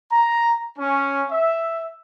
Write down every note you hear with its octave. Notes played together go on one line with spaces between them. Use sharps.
A#5
C#4
E5